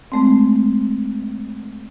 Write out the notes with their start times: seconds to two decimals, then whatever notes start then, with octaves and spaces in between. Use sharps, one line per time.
0.12 G#3 A3 C4